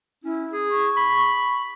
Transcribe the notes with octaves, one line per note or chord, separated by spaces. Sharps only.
C#4 E4
G#4
C#6
B5